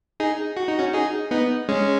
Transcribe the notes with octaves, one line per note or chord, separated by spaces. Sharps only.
D#4 G#4
F#4
D#4
C#4 F#4
D#4 G#4
B3 D#4
G#3 C#4